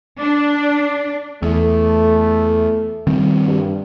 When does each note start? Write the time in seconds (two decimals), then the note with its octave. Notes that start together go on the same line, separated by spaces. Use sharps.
0.21 D4
1.42 E2 A3
3.07 D#3 G3 C4
3.45 G2